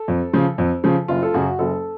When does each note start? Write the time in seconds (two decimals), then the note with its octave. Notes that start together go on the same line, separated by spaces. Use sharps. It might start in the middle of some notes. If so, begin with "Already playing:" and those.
Already playing: A4
0.08 F2
0.33 C#3 F3
0.58 F2
0.84 C#3 F3
1.08 F#1 F4
1.22 A4
1.34 F#2 C#3 F#3 F#4
1.59 F#1 A4